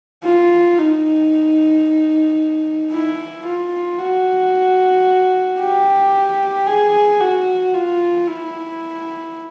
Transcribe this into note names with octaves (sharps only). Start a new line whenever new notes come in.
F4
D#4
E4
F4
F#4
G4
G#4
F#4
F4
E4